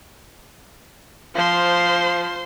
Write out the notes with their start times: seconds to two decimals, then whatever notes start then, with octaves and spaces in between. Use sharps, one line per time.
1.35 F3 C5 C6